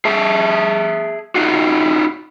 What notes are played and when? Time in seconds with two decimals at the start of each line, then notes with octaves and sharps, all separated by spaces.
0.05 G#4 E5 A5
1.35 D#4 F4 F#4